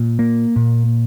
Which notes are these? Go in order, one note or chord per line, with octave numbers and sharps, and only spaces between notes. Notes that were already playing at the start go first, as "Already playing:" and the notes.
Already playing: A#2
A#3
A#2